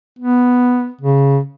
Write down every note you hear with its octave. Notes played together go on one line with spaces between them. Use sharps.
B3
C#3